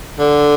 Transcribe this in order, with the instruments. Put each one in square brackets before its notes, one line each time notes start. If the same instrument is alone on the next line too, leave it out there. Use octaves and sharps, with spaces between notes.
[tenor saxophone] D3